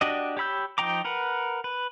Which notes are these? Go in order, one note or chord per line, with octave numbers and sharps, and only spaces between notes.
D4 F#4 G4 D5 D#5
G4 C#5 B5 E6 G6
F3 D#4 G5 A#5 D6
A#4 B4 F#5
B4